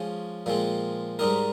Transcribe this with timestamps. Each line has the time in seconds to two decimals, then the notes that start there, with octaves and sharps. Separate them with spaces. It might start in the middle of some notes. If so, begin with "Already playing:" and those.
Already playing: F3 G#3 C#4
0.46 A#2 F3 G#3 C4
1.19 G#2 G3 C4 D#4 A#4